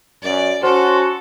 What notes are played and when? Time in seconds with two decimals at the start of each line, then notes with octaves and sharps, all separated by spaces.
0.22 F#2 D5
0.63 C#4 F#4 A4 C5 C6